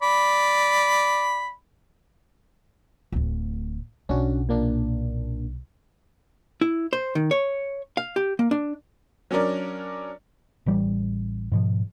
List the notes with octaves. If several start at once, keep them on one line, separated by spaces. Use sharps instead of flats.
D5 B5
D1 D2
B1 C#4 D4 F#4
A#2 A#3 D4
E4
C5
D#3
C#5
F5
G4
A#3
D4
F#3 C#4 D4 A#4 D5
A1 E3 G3
G#2 B2 F3